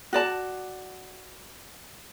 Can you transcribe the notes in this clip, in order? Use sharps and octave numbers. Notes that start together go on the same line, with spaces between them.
F#4 D5 A5